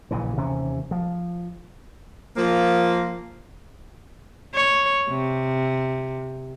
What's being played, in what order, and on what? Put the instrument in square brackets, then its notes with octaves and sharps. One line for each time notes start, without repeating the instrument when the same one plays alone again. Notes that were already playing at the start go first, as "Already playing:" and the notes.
[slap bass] A#1 A#2 C#3 E3
D#2 C3 E3 C#4
F3
[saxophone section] F3 A#3
[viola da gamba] C#5
C3